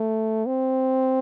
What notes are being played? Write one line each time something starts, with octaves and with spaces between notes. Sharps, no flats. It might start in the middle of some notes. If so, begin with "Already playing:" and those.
Already playing: A3
C4